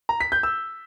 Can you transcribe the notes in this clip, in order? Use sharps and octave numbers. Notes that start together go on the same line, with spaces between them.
A#5
B6
G6
E6